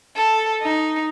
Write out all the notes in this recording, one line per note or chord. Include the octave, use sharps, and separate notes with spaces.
A4
D#4